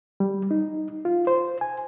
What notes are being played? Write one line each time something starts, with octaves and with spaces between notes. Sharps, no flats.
G3
D#4
F4
C5
G#5